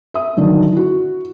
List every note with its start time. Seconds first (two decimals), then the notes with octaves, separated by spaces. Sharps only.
0.14 E5 D#6
0.37 G2 D3 D#3 F#3
0.72 E4 F#4